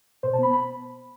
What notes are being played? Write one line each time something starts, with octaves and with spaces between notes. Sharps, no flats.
B2 C5
A5
B3 B5
B5